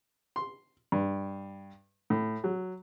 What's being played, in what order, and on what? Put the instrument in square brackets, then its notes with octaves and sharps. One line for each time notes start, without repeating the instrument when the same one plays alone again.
[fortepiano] C6
G2
A2
F#3